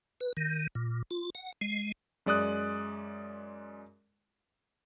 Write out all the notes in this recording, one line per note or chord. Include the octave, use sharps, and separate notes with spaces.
B4
D#3
A#2
F4
F#5
G#3
F#2 G#3 D5 D#6 F#6